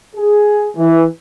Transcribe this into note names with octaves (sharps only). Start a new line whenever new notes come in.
G#4
E3